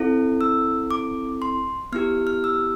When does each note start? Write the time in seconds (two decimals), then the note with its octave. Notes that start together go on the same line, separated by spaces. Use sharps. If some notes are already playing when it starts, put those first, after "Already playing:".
Already playing: C4 E4 A4
0.41 E6
0.91 D6
1.42 C6
1.92 B3 E4 G4 F6
2.27 F6
2.44 E6